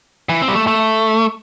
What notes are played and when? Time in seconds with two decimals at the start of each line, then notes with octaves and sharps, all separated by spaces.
0.29 E3
0.42 C4
0.48 G3
0.55 A3
0.67 A3